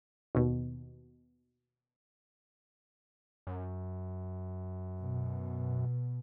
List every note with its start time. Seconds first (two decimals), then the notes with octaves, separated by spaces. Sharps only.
0.35 D#2 B2
3.47 F#2
4.99 B2